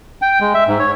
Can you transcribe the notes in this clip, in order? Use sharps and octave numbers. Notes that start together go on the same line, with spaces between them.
G5
G#3
E5
G#2
C#5